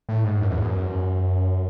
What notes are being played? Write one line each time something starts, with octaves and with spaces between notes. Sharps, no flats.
A2
G#2
F#2
E2
F#2